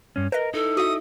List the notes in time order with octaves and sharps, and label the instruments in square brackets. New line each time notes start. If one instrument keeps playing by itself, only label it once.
[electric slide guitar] G2 C#4
[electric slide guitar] A#4 [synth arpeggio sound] B4 D#5
[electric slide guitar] D#4 E4 [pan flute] A4
[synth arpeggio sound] F#4 E5 [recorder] D#6